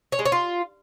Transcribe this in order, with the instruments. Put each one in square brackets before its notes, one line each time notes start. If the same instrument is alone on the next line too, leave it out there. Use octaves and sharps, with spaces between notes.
[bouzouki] C#5
G#3
C#5
F4